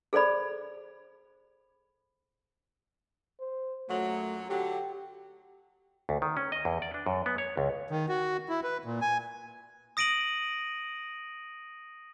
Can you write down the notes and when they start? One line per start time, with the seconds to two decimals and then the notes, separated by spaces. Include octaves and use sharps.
0.13 G#4 A4 C5 D5 B5
3.40 C5
3.89 F#2 A#2 F#3 A3
4.50 D3 F#3 G4
6.09 D2
6.22 D#3
6.37 C#4
6.52 D#5
6.65 E2
6.82 D5
6.94 D4
7.06 F#2
7.26 B3
7.38 C#5
7.57 C#2
7.90 D#3
8.09 F#4
8.49 E4
8.64 B4
8.85 A#2
9.01 G#5
9.97 D#6 A#6 D7 D#7 F#7